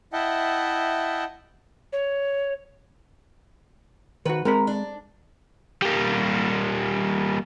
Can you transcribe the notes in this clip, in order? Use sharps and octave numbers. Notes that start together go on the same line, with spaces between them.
E4 D#5 E5 F#5 G5 A5
C#5
D#3 F#4 B4
G#3 C4 A#4 B5
D4
G3 A#3